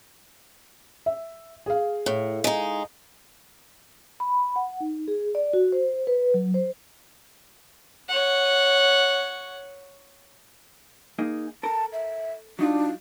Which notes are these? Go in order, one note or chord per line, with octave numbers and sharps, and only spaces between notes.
E5
G#4 F5
A2
G#3 D#4
B5
F#5
D#4
G#4
D5
F#4
C5
B4
F#3
C5
C#5 F#5
A#3 D#4 G#4
A4 A#4 A5
E5
F#3 D4 D#4 F4